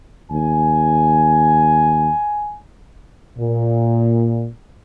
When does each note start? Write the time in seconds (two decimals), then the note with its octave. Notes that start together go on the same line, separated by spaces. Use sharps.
0.32 D#2 G#5
3.38 A#2